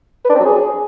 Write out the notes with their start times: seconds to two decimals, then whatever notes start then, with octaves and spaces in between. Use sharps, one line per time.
0.24 B4
0.30 D4
0.35 C4
0.40 F#3
0.45 G#4